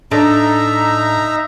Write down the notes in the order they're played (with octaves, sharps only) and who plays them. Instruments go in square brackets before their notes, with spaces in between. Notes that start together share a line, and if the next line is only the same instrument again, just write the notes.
[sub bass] A2 [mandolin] D4 A4 [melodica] D#4 E5 A#5